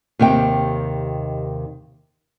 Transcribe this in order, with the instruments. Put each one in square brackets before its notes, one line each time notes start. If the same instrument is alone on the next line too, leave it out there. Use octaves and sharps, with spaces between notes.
[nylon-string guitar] D#2 C3 D#3 G5